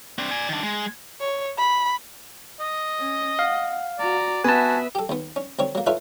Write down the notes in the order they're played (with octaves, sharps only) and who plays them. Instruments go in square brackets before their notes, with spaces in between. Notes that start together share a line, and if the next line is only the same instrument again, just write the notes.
[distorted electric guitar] C4 D4
D5 G#5
D#3 D4
G#3
[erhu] C#5
B5
[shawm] D#5
[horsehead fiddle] C#4
[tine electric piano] F5 [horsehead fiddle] F#5
[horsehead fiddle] F#4 A#5 [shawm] D5
[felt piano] B3 [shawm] F#4 [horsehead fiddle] B4 E5 [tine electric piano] G#5 A5
[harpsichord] G4 A4
D#2 B3
C#4
D2 C4 C#5
F#3 A#3
E4 F4 A4 B4 C#5 E5